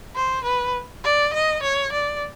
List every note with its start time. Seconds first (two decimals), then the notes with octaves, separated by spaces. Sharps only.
0.16 C5
0.45 B4
1.04 D5
1.34 D#5
1.63 C#5
1.92 D5